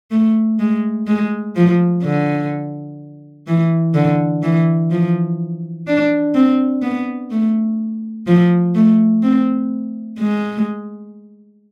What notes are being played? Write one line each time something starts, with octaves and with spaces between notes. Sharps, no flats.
A3
G#3
G#3
F3
D3
E3
D3
E3
F3
D4
C4
B3
A3
F3
A3
C4
G#3